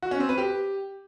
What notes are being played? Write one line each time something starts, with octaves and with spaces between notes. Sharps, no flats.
F#4
C#4
C4
B4
G4